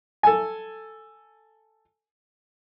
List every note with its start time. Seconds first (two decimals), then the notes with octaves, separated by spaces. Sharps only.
0.23 A4 G#5